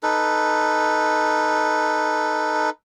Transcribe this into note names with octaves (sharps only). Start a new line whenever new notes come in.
D#4 A4 B4